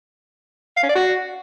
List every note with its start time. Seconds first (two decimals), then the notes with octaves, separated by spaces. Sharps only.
0.77 F5
0.83 C#4
0.89 D5
0.95 F#4